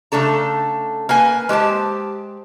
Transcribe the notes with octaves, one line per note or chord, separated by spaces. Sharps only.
C#3 A3 D4 A4 A#5
A#3 B4 G#5
G#3 G4 C5 A5